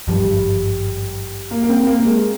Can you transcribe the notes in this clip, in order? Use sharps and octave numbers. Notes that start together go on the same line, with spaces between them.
G#1 G2 F3 G3
A#3
A#3
C4
A#3
A#3
G#3